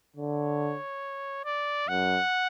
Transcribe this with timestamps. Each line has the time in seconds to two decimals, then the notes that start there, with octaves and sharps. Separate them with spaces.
0.16 D3 C#5
1.45 D5
1.88 F#2 F#5